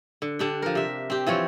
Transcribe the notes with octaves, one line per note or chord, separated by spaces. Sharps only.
D3
D3 D4 G4
F3 A#4
C3 E5
C4 G4
E3 F3 C4 C#5